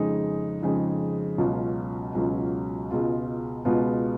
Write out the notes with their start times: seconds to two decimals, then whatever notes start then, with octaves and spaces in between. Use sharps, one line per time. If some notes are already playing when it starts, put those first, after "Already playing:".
Already playing: F2 C#3 G#3 D#4
0.62 F2 C#3 G#3 D#4
1.38 C#2 B2 F#3 C#4 F4
2.15 C#2 B2 F#3 C#4 F4
2.90 C#2 B2 G#3 B3 F4
3.65 C#2 B2 G#3 B3 F4